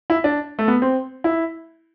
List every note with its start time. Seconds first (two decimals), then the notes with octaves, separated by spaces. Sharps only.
0.10 E4
0.24 D4
0.59 A3
0.68 B3
0.82 C4
1.24 E4